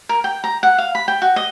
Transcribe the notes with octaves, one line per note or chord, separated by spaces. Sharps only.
A#4
G5
A#5
F#5
F5
B5
G5
F#4
D#5